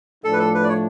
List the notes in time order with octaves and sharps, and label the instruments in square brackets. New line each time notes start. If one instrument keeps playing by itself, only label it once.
[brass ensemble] A2 F3 A3 D4 [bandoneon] A4
[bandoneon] B4
A4
B4
D5
C#5